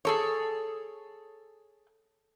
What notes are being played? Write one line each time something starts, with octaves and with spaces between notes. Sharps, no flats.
G#4 A4 C#5